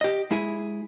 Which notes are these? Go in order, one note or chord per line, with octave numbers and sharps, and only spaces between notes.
G4 D#5
G#3 E4 G#4